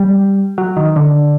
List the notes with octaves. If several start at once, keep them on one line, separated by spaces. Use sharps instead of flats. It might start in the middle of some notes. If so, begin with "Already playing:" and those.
Already playing: G3
F#3
D#3
D3